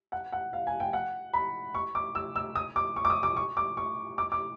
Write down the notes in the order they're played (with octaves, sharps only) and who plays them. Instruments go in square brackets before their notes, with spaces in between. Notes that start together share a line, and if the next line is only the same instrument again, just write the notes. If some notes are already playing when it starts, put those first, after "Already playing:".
[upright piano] F#5
F#5
F5
G#5
G5
F#5
B5
C#6
D6
E6
E6
D#6
D6
C#6
D6
D#6
D6
C#6
D6
C#6
D6
D6